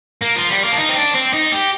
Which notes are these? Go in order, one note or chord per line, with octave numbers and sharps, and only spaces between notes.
A#3
F3
G3
A#3
D4
D#4
C4
D4
C4
D#4
G4